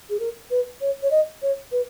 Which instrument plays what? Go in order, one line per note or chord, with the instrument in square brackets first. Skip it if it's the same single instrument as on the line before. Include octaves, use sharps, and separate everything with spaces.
[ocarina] G#4
A#4
B4
C#5
C#5
D#5
C#5
B4